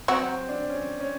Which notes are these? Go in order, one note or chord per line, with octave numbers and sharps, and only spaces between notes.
F#3 C4 F#4
D4
C#4
C#4